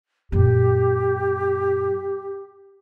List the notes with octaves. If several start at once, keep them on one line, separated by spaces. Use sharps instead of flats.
F#2 A#2 G4